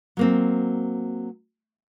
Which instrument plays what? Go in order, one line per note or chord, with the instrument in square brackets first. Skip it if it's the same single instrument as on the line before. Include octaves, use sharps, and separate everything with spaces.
[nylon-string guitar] F#3 A#3 C4